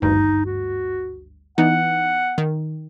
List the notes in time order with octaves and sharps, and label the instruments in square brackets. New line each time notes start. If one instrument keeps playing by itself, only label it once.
[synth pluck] G#1 D2 G2 [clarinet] D#4
[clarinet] F#4
[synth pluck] E3 B3 D#4 [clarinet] F#5
[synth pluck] D#3